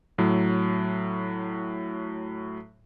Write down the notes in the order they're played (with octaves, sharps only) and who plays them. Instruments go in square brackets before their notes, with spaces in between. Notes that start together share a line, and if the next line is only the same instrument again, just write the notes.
[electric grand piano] A2 F#3